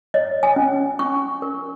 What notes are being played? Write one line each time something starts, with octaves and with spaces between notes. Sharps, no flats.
C#5 D#5
G#5
C#4
C#4 C#6
A#4